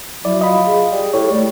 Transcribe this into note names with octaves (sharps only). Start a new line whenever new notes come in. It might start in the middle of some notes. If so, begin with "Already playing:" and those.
F#3 E4 D5
F4 D#5 B5
G#4
G3
A2 G4 C#5
G3 A3